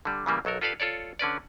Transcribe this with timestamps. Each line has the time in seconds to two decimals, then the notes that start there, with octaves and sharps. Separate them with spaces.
0.05 D3 G3
0.26 C#3 E3 G3 A#3
0.45 B1 F#3 A4 A#4
0.61 F4 G4 A4 B4 D5 F5
0.80 F4 A4 C#5 D5
1.19 D3 C#4 B4 D5